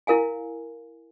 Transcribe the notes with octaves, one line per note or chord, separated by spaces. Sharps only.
E4 A#4 F5 G#5